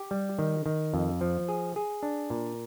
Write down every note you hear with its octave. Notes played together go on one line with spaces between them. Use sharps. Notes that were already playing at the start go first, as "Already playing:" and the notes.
Already playing: G4
G3
D#3
D#3
F2
F3
G#4
G#4
D4
A#2